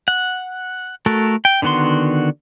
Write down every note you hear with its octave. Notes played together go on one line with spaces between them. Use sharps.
F#5
A3 F#4 A4 A#4
G5
D3 D#3 B3 F#4 C6